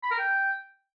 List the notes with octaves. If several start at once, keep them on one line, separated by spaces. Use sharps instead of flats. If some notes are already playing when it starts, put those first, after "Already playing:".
B5
A#4
G5